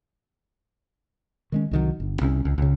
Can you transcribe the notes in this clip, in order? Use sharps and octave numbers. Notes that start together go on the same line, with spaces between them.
D#3 G#3 C#4
C2 D#3 F#3
G1
C2 C#4
C#2
C#2 C#3